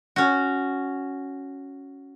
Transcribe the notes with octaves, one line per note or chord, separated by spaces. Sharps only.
C#4 F#4